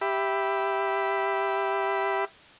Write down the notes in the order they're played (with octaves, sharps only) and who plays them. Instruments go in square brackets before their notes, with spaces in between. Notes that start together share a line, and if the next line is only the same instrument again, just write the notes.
[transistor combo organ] G4 E5 B5